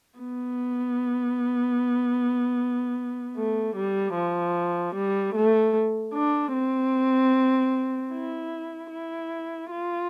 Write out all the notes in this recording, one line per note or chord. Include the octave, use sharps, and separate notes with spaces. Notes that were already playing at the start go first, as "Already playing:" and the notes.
B3
A3
G3
F3
G3
A3
D4
C4
E4
E4
F4